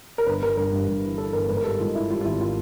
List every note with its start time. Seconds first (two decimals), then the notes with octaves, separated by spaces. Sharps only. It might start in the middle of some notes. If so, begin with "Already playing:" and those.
0.18 A#4
0.27 G1 B4
0.43 G1 A#4
0.57 G2 A#4
0.72 G2
0.88 G2
1.04 E3
1.18 E3 A4
1.33 G1 A#4
1.49 G#2 B4
1.57 A#4
1.64 G3 A4
1.79 G#2 F4
1.95 G#2 E4
2.09 G3 F4
2.21 F4
2.25 G#1 E4
2.41 F4